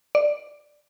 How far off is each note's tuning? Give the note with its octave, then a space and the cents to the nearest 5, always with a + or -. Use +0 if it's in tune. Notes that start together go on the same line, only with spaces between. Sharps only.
D5 +5